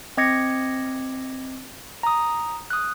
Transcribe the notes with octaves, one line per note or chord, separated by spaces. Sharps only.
C4 D#5 D6 G#6 A#6 C#7
A#5 D#6
D#6 F#6